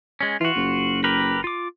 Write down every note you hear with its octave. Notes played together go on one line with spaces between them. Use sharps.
G#3 C#4
E3 F4 F#4
F#1
G4 A#4 B4
F4 D6